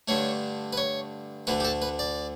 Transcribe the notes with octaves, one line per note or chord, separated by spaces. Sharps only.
G2 D3 A3 C#5
B4
C#5
D2 D3 A3 B4
G4
A4
B4
D5